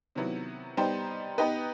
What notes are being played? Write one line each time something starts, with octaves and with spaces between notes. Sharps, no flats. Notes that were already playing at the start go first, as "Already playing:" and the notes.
C3 D#3 F#3 B3 E4
G3 B3 D#4 G4 C5
B3 D#4 G4 B4 D#5